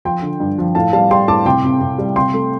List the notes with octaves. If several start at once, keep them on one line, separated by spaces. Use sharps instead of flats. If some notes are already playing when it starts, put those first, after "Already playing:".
F3 G5 C6
D3
G2
F3
A2 F5 A5
G3 F5 A5
G3 G5 C6
A2 A5 D6
C3 G5 C6
C3
C3
G3
C3 G5 C6
A3